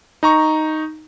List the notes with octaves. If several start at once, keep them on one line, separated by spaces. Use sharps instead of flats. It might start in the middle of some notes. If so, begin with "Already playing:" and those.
D#4 A#5 C#6